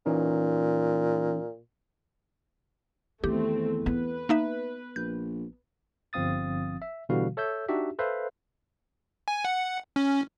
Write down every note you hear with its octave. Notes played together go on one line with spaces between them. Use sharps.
A#2 E3 C#4 D#4
E2 D#3 A3 C4 G4
B3 B4
A#3 D#4 E5
A#1 G6
G1 F3 C4 F5 D#6 A6
E5
B2 D3 E3 G3 F#4 F5
A4 C#5 E5 E6 G6
D4 D#4 F#4 G4 E5
A4 B4 C5 E5 F5
G#5
F#5
C#4